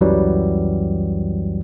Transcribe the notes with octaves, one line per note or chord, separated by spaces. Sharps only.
C#2 F#2 E3 F#3 G3